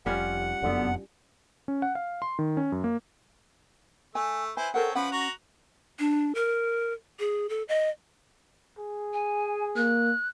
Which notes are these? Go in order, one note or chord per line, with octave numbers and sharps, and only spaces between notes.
F1 G3 C#4 F4 F#5
F1 F#2 D3 B3
C#4
F#5
F5
C6
D#3
C#4
F#2
A#3
A3 G#5
E4 B4 C5 G#5
C4 C#4 A4 A#4 F#5
F3 C#4 B4 F#5 B5
F#4 A#5
D4
A#4
G#4
A4
D#5
G#4
G#5
A#3 F#6